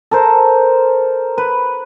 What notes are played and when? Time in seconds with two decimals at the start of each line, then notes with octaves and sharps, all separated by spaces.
0.11 A4 A#4 C5
1.38 B4